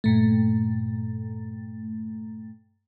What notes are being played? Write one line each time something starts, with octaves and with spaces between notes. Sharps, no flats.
G2 A#2 A3